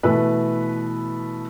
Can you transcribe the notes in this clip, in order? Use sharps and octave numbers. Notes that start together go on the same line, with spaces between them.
B2 E3 A3 B4